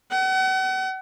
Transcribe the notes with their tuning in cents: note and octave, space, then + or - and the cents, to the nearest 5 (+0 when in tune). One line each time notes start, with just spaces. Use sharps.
F#5 +40